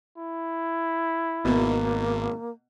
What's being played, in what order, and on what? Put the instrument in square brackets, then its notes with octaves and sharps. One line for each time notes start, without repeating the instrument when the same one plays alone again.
[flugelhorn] E4
[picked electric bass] G#1 [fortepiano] B2 [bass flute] A#3